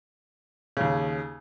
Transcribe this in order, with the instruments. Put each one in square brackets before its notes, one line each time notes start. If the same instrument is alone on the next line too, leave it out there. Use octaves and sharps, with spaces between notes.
[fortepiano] D#2 C#3